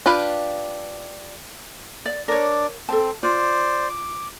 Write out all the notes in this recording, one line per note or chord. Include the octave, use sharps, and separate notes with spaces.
D4 F4 G4 B4 F5
D5
D4 A#4 C#5 D5
C4 A4 A5
F4 C5 D5
D6